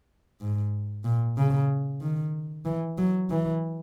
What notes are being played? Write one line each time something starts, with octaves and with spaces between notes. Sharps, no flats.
G#2
A#2
C#3
D#3
E3
F#3
E3